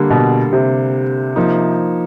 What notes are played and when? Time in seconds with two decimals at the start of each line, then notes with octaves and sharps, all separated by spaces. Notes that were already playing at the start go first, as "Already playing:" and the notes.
Already playing: D3 G3 A#3
0.10 B2
0.53 C3
1.36 F3 A#3 D#4